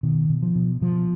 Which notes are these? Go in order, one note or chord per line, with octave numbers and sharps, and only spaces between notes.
B2 D#3
B2
F3
B2
B2 F3